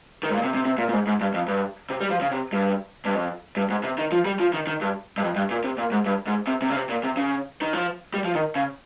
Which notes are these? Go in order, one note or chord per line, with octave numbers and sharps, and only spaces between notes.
D#3
G#2
A#2
C3
C3
C3
A#2
A#2
G#2
G#2
G2
F2
G2
C3
G3
F3
C#3
C3
G2
G2
F2
G2
G#2
C3
D#3
F3
G3
F3
D#3
D#3
G2
G2
F2
G2
A#2
C3
A#2
G#2
G2
G#2
C3
C3
C#3
C3
A#2
C3
C#3
D#3
F3
G3
F3
D#3
C#3